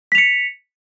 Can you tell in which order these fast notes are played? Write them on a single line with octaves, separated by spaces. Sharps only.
B6 F7 C#7